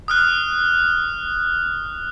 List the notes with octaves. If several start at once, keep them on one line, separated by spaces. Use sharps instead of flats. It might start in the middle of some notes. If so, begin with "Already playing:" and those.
D#6 F6 F#6